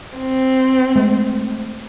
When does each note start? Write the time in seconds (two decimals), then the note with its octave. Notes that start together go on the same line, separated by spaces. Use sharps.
0.18 C4
0.96 G#3 A3